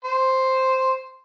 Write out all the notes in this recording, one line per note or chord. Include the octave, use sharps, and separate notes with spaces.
C5